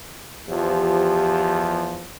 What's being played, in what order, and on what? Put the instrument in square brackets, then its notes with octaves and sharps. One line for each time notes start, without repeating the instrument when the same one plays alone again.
[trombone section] E2 F3 [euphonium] G4